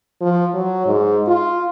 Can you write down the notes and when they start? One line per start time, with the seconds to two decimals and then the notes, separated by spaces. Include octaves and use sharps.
0.21 F3
0.54 F#3
0.86 G#2
1.28 F4